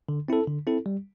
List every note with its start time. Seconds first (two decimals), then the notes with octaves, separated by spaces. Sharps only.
0.09 D3
0.28 C4 E4 A4
0.48 D3
0.67 C4 E4 A4
0.86 G3